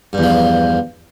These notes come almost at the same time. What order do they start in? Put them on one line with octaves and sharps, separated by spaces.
G2 E2 F3